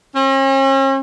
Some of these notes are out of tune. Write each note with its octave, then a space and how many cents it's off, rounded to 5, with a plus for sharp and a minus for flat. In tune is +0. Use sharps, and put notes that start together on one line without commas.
C#4 -45